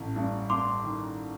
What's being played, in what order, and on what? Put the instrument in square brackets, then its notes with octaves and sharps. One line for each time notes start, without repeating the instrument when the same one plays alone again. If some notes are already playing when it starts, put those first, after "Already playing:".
Already playing: [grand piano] A1
G2
[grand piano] G2 [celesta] C6 D6
[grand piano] D#3